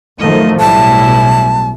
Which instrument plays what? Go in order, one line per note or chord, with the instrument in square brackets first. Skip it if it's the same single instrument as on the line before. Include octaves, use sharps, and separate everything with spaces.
[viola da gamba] F#2 D#5 [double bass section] D#3 F3 A3
[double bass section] B1 [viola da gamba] A2 G3 E4 [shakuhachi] A5